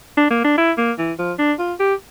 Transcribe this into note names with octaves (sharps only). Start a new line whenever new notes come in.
D4
A#3
D4
E4
A#3
E3
F3
D4
F4
G4